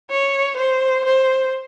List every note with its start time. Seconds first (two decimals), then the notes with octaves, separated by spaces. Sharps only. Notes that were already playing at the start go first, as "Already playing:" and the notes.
0.10 C#5
0.57 C5
1.05 C5